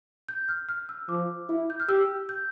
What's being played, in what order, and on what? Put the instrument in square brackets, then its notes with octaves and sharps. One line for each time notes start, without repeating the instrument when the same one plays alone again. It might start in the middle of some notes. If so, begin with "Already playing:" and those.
[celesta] G6
F6
F6
E6
[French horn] F3 [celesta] D6
[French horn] E4
[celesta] G6
F6
[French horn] G4 [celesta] E6
[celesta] G6